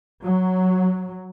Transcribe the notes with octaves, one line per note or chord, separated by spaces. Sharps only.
F#3